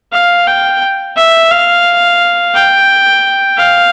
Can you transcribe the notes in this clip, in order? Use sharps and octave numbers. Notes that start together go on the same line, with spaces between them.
F5
G5
E5
F5
G5
F5